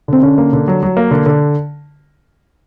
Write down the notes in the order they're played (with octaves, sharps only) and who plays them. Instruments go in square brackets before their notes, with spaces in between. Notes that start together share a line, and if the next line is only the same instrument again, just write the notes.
[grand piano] D3 [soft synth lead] C4
[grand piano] D3 [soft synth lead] C#4
[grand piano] A#3
D3
F#3
F#3
A#3
D3
D3